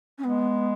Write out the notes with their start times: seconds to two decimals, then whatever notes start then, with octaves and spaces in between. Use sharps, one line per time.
0.19 C#4
0.24 G#3 B3